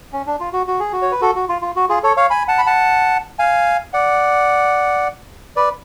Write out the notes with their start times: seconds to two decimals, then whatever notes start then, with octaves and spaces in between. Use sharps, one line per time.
0.13 C#4
0.27 D4
0.40 F4
0.53 F#4
0.67 F#4
0.80 G#4
0.93 F#4
1.02 C#5
1.12 B4
1.21 F#4 A4
1.36 F#4
1.49 F4
1.62 F4
1.76 F#4
1.89 F4 G#4
2.03 A4 C#5
2.17 C#5 F5
2.30 G#5 B5
2.48 F#5 A5
2.58 B5
2.66 F#5 A5
3.39 F5 G#5
3.93 D5 F#5
5.56 B4 D5